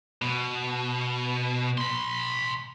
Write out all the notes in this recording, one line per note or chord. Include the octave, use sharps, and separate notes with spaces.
B2
B5 C6